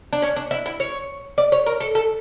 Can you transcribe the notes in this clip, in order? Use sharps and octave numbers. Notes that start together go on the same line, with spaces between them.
D4
C#4
D4
E4
E4
C#5
D5
C#5
A#4
A4
A4